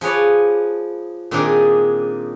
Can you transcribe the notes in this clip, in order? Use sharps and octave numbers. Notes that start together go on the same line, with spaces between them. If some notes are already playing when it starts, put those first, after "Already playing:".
F3 G#4 B4 C#5 D5
A#2 D#3 C4 D4 D#4 G#4